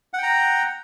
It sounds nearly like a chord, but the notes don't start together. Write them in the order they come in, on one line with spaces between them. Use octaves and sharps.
F#5 G5 A#5